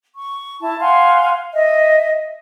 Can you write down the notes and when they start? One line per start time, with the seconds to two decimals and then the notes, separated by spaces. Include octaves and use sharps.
0.15 C#6
0.61 E4 A5
0.80 F5 F#5 G#5 C6
1.54 D#5 E5